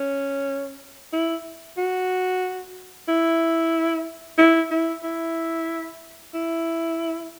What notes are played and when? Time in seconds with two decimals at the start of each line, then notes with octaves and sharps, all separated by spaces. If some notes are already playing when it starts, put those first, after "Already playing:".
Already playing: C#4
1.13 E4
1.78 F#4
3.08 E4
4.38 E4
4.71 E4
5.04 E4
6.34 E4